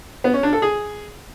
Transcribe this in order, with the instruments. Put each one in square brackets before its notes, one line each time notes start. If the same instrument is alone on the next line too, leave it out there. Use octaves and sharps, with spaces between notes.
[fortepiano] B3
C#4
D4
A4
G#4